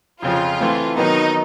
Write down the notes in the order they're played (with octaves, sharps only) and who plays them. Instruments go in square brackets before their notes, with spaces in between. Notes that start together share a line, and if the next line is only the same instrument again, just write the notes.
[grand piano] F2 C#3 F3 [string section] F4
[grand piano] E3 A3 C4
[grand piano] D#3 F#3 B3 [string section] D#4